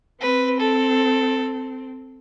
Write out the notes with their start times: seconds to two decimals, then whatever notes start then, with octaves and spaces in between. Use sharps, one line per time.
0.20 C4 B4
0.59 A4